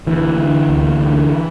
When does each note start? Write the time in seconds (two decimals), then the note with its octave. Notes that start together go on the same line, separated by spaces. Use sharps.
0.07 D2 E3
0.38 D3
0.69 D2
1.00 D3